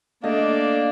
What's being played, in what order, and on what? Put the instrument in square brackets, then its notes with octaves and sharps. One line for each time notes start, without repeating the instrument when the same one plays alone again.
[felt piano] A3 D#5 [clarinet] A#3 [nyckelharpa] D4